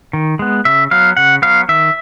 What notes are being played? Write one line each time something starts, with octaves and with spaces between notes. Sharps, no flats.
D#3
G#3 B3
C#3 E5
F#3 B3 F5
C#3 F#5
F#3 B3 F5
D#3 E5